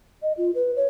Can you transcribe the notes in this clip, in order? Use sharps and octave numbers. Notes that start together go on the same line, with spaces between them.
D#5
F4
B4
C#5